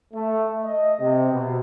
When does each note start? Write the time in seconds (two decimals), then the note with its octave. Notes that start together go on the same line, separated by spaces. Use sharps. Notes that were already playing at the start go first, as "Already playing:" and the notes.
0.13 A3
0.64 D#5
1.00 C3
1.32 B2